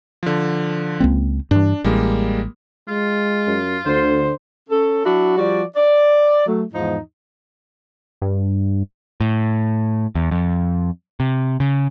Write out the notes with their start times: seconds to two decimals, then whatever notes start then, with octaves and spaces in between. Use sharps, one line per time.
0.23 D3 F3
1.00 C#2 A#3 C4
1.51 G2 E3 D4
1.84 A1 G3 G#3 A#3
2.88 G#3 F4
3.47 F#2
3.86 D2 D3 C5
4.69 C#4 A4
5.05 F#3 D4 E4 F#4
5.37 F3 G3 F#4 D5
5.76 D5
6.46 F#3 A3
6.73 E2 G#2 F3 D#4
8.22 G2
9.21 A2
10.15 E2
10.31 F2
11.20 C3
11.60 C#3